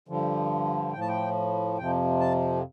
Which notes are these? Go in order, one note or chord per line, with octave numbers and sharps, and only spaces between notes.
G2 D3 F3
A2 F3 G5
A5
G5
F2 C3 F3 G5
A5